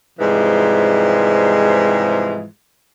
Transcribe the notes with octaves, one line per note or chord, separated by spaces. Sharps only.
G#2 C3 E3 F3 G3 G#3